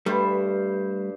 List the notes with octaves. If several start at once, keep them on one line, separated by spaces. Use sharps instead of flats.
G2 G3 A3 C5 B5